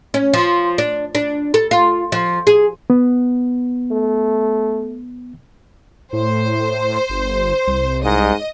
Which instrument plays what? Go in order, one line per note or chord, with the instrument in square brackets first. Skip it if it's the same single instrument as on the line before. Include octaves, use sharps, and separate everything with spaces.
[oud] C#4
F3
D4
D4
A4
F4
F3
G#4
[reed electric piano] B3
[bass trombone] A3
[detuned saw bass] A2 [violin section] C5
[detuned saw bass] G1
C2
[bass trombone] G#2 [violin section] D#5